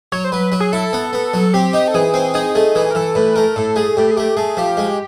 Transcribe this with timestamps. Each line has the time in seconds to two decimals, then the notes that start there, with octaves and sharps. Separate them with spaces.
0.12 F#3 C#5
0.24 C5
0.32 F#3 B4
0.52 F#3
0.60 G#4
0.72 E4 A4
0.93 B3
1.13 B3
1.34 F#3
1.54 C4 G4
1.73 D#4
1.88 A4
1.94 E3 G#4
2.14 C4
2.34 D#4 G#4
2.55 A3 G#4
2.75 E3 G#4
2.91 A#4
2.95 E3 A4
3.15 A2 B4
3.36 A3 A#4
3.56 A2 A4
3.76 A3 G#4
3.97 A2 G4
4.11 G#4
4.17 A3 G4
4.37 A3 G#4
4.57 F3 G4
4.77 G#3